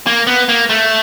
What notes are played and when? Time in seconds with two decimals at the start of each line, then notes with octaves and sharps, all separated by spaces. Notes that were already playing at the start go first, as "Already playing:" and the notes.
0.07 A#3
0.27 B3
0.49 A#3
0.70 A3